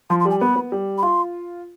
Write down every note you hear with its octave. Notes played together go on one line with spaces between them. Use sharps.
F3 C6
C6
G3
G#5
B3 B5
B3
G3
B5
F4 C6